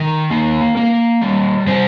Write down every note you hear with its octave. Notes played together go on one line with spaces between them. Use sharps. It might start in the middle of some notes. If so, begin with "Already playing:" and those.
Already playing: D#3 A#4
A#3
A#3
G3
G3 C5